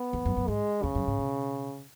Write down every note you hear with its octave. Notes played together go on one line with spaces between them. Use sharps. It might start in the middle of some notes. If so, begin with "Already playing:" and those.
Already playing: B3
E2
F#2
F#2
G#2 G#3
E2 C#3
F#2
G#2
B2